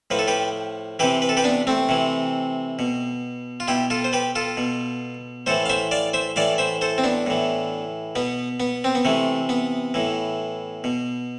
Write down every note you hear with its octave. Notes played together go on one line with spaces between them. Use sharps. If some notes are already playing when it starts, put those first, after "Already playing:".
A2 F3 B4
A4
G4 B4
C3 E3 G4 B4
B4
A4
G4 B4
B3 D4
A3 C4
C3 E3
B2
F4
B2 E4 G4
F4 A4
C5
G4 B4
F4 A4
B2
A2 E3 A4 C5
F5
C5 E5
D5 F5
C5 E5
A2 E3 D5 F5
C5 E5
A4 C5
C4
B3 D4
A2 E3
B2 B3
B3
C4
B3
C3 E3 A3
B3
A2 E3
B2